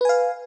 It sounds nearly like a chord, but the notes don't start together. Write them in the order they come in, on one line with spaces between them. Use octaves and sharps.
B4 G#5 F5